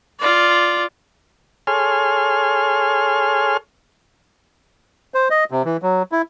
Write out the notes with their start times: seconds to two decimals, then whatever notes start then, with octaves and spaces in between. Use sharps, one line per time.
0.20 F4 D5
1.67 G#4 A4 C#5 G#5 C6 F6
5.14 C5
5.30 D#5
5.51 C3
5.65 E3
5.82 F#3
6.12 E4